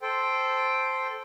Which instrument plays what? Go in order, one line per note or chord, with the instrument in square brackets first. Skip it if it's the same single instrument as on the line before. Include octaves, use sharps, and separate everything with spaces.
[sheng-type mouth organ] A4 C5 G5